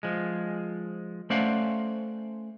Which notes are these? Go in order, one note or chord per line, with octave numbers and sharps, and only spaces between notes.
F3 G#3
A3 C#4 C5 D5 F5 F#5